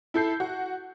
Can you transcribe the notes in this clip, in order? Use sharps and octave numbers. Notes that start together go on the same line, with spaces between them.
E4 A4 G6 C7
F#4